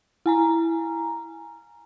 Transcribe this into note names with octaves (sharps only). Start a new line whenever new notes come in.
E4 G#5 A#5